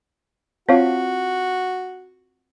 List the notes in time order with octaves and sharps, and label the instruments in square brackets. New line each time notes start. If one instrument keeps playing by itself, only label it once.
[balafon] C4 F4 [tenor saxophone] F#4 [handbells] C5 C#5 F5